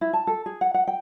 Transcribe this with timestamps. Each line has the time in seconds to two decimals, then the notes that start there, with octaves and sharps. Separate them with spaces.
0.01 E4
0.13 A5
0.27 A4
0.46 G#4
0.61 F#5
0.74 F#5
0.87 G5